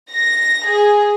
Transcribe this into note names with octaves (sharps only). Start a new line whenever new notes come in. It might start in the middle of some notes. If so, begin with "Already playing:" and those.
A#6
G#4